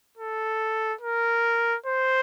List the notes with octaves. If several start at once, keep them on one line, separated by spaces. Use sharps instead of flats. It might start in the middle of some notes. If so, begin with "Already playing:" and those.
A4
A#4
C5